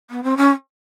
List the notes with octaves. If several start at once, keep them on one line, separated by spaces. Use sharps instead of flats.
B3
C4
C#4